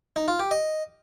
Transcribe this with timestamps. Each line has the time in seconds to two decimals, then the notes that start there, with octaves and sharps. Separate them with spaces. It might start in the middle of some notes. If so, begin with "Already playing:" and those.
0.16 D#4
0.28 F4
0.39 G4
0.51 D#5